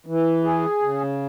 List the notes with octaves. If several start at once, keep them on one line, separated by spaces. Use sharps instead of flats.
E3
G#4
C#3